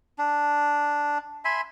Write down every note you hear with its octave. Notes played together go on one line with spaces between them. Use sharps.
D4
E5 G#5 B5 C6